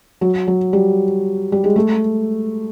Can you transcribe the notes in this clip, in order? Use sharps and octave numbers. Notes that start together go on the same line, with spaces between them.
F#3
F#3
G3
G3
G#3
A3